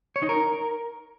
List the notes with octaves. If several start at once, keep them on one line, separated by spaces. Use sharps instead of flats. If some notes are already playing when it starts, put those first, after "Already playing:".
C#5
D#4
A#4